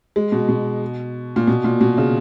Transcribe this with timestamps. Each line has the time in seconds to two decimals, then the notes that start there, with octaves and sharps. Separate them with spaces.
0.16 G#3
0.32 B2
0.48 B2
1.36 A#2
1.47 B2
1.64 A#2
1.81 B2
1.98 C#3